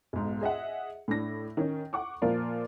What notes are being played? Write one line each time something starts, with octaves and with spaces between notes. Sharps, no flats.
B1 G#2
G#4 D#5 E5 F#5
A2 D4 A#6
D#3 C#4
F#5 C#6 D6
A#2 F3 F4 A#4 D5